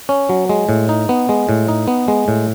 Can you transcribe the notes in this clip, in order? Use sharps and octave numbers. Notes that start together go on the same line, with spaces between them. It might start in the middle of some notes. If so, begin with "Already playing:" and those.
C#4
F#3
G#3
A2
D#4
B3
G#3
A2
D#4
B3
G#3
A2